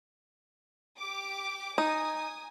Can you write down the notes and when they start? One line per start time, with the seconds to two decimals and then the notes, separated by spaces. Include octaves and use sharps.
1.00 G4 D6
1.78 D#4 G#5 D#6